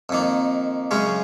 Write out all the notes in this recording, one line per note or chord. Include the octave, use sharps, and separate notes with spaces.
F2 D#3 A#3
F#2 C#3 G#3 C#4